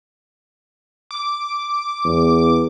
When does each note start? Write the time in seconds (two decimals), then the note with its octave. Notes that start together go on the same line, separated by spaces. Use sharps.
1.11 D6
2.05 E2